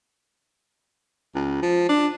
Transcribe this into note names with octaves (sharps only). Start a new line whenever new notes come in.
C#2
F3
D4